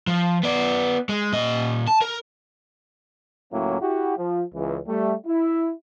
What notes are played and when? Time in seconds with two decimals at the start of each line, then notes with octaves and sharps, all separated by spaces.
0.07 F3
0.43 B3 D5
1.09 G#3
1.32 A#2 D#5
1.87 A5
2.02 A#4
3.52 C#2 A2 F#3 A#3 C#4 E4
3.81 E4 F#4 G4
4.18 F3
4.55 C#2 E3
4.87 G3 A3
5.27 E4